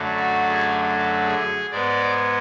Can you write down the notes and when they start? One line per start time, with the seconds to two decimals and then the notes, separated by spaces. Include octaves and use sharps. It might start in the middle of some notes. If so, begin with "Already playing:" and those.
Already playing: F#2 D3 F#3 A3
0.18 F#4
0.49 G#4
1.25 G#4
1.71 G#2 G#3 B3 D5